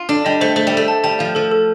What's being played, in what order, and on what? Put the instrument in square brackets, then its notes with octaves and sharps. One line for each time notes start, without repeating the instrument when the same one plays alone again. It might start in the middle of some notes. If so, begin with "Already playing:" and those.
Already playing: [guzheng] F4
[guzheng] D4 [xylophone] A4
[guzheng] G3 [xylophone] D#5
[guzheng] A3 [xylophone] C5
[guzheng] A3 [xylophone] C5
[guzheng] G3
[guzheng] A3 [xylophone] A4
[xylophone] A5
[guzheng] G3 [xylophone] A5
[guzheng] F3 [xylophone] F5
[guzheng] F3 [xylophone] A4
[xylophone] A4